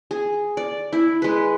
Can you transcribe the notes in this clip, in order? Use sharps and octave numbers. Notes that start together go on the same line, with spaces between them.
G#4
D5
E4
G#3 B4